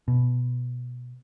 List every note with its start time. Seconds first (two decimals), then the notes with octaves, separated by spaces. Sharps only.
0.08 B2